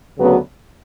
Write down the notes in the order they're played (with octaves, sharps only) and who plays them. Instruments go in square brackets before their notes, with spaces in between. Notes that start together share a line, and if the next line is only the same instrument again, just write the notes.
[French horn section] D2 C#3 F#3 B3